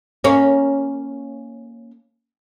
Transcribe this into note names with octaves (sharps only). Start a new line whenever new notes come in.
A#3 C#4